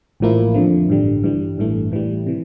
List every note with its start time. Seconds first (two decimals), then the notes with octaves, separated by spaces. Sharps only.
0.20 A1 A2 F3 A#3 E4
0.54 F2 D3 F3
0.89 A1 G2 D3 G3
1.24 G2 E3 G3
1.57 A1 G2 E3 A3
1.92 A2 E3 G3
2.27 C3 E3